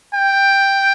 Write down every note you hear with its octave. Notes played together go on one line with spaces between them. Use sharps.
G5